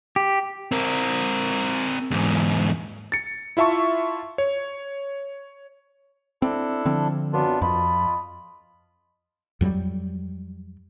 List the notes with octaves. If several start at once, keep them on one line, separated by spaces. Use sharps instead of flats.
G4
C4 A#4
E2 G#2
A6 C#7
E4 F4 E5 A5 C#6
C#5
C4 D4 E4 A4
D3 F3 C4
F#2 B3 D4 F4
F2 F4 D#5 A5 B5
F2 F#3 G3